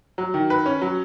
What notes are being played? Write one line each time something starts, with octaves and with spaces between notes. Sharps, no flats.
F#3
D#3
B4
C#4
F#3